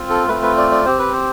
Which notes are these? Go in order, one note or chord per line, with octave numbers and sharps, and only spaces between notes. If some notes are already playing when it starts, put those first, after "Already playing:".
Already playing: C4 F4
A4
A3 C4 F4 B4
B4
D5
D5
C4 G4 C5
B4
C5